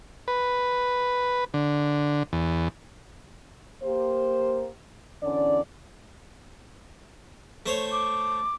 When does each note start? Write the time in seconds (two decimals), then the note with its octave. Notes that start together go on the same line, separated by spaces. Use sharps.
0.28 B4
1.54 D3
2.33 E2
3.83 A#3 G4 C5
5.23 E2 D3 C#4 D5
7.66 A3 C5 C#5
7.92 D6